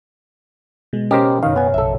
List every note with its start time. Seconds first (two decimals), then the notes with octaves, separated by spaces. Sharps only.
0.93 B2 G#3
1.11 B2 B3 C#4 G4 A#4 C5 D#5
1.28 B5
1.43 F#1 F#2 D#3 F5
1.56 B3 G#5
1.74 A#1 A4 E5